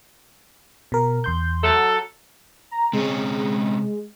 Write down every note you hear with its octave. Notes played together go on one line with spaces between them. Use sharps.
B2 A#4
E2 C6 G6
F#3 A4
A#5
C3 G#3 C#4